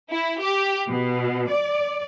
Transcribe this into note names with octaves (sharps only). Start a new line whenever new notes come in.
E4
G4
B2
D5